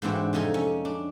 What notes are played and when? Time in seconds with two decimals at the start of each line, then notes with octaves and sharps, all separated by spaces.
0.02 G#2 E3 C4 D4 F#4
0.33 F2 C3 D#4 A4 G#5
0.54 C#4
0.85 D4